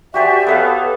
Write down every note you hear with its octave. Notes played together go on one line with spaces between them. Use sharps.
F#4 G4 C5 D5 E5 G#5
B3 A4 B4 C#5 F5